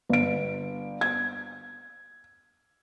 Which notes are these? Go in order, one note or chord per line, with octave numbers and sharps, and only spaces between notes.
G1 D7
G#6